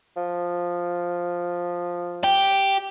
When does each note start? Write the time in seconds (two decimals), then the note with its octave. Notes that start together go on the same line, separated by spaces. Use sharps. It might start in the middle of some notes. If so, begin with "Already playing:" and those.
0.16 F3
2.24 G4